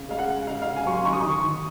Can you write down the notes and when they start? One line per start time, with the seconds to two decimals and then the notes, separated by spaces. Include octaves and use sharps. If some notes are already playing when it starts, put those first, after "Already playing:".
Already playing: C#3
0.09 G#3 F5
0.19 F#5
0.28 G#3
0.47 C#3 F5
0.62 F5
0.67 C#3
0.76 G#5
0.86 F#3 C#6
0.91 C6
1.05 D#3 C#6
1.13 D#6
1.20 D#3 C#6
1.44 D#3